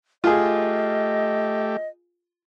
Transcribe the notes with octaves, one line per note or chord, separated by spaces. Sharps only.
A3 F4 G4 G#4 D#5